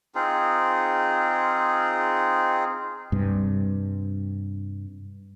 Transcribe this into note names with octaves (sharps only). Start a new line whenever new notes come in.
C4 D#4 F4 G#4
G2 C3